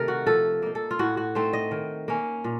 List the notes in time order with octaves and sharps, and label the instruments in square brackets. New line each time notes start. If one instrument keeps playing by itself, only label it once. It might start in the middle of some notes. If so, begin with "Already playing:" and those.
Already playing: [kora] C3 D#3 A3 A#4
F#4
F3 A4
A#3 D#4
A4
F4
A2 F#4
F#4
A3 C4 D#4 C5
D#5
D#3
A#3 C#4
A#2